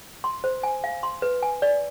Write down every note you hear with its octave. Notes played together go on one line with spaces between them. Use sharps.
C6
C5
G#5
F5
C6
B4
G#5
D5